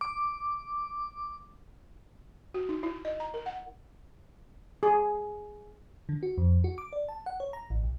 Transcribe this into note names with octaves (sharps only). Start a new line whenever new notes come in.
D6
F#4
D#4
E4
D#5
A#5
A#4
F#5
G#4
D3
F#4
F2
F#4
D6
D5
A5
F#5
C#5
A#5
A1
B1